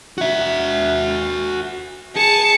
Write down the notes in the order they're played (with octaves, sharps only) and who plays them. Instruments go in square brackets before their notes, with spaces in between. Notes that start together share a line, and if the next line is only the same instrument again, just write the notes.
[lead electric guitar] F#4 E5
[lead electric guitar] G#4 [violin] A5 C#7